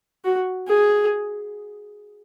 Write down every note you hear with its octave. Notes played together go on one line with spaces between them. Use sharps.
F#4
G#4